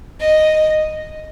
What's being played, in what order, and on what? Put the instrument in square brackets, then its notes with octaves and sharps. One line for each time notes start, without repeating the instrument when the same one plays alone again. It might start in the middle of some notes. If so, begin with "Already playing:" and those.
[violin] D#5